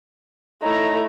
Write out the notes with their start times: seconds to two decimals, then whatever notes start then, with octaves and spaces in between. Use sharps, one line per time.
0.63 A3 D#4 E4 C#5 A#5